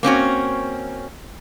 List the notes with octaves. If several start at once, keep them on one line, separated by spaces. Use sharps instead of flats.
A#3 C4 C#4 F#4